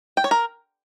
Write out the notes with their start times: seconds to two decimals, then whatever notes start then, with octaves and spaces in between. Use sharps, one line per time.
0.17 G5
0.24 C#5
0.31 A#4